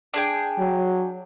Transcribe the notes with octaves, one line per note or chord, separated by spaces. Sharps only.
D4 G#4 G5
F#3